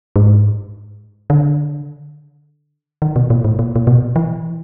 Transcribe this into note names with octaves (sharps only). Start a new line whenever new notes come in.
G#2
D3
D#3
B2
A#2
A2
A#2
A#2
B2
E3